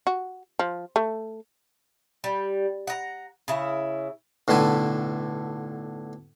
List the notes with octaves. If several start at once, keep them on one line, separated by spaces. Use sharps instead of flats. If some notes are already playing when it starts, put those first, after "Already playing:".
F#4
F3
A3
G3
F#5 A#5
C#3 E4
B1 A2 D3 E4 G#5